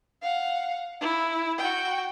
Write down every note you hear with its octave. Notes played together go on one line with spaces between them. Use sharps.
F5 F#5
E4
F#4 G5